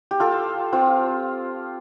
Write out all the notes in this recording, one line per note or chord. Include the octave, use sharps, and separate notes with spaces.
G4
F4 A4
C4 F4